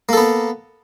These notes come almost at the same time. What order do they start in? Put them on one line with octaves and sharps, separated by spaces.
A#3 A4 B3